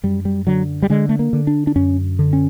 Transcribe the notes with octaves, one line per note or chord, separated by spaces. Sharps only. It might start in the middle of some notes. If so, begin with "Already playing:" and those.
F#2 G3
G3
D3 F#3
G3
D3 G#3
A3
A#3
D3
D4
D4
F#2 C#4
D3
C#4